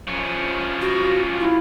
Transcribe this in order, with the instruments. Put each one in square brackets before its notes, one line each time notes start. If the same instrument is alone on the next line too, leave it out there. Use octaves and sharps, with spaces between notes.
[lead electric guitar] F3 C#4
[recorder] F#4
E4